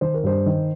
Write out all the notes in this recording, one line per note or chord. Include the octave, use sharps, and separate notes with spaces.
D#3 C5
A#4
G2 C5
D#3